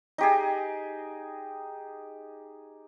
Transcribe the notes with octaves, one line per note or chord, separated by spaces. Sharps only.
D#4 G4 G#4